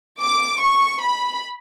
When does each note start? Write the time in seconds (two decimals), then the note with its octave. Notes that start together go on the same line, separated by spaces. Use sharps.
0.21 D6
0.62 C#6
1.03 B5